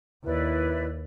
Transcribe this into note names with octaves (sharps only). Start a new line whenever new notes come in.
D#2 E4 B4 D5